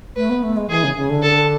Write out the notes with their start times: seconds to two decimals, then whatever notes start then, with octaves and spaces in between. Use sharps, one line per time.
0.16 A3 B4
0.29 B3
0.42 A3
0.56 G#3
0.69 E3 G#4
0.83 C#3
0.96 C#3
1.09 D3
1.22 A4